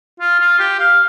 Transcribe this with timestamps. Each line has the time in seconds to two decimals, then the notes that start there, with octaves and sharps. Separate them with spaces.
0.20 F4
0.40 F4
0.59 G4
0.80 F5